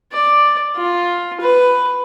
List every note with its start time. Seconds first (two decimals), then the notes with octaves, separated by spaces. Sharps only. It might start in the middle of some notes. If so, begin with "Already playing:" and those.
0.13 D5
0.76 F4
1.40 B4